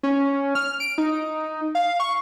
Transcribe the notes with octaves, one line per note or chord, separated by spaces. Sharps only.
C#4
F6
D7
D#4
F5
C#6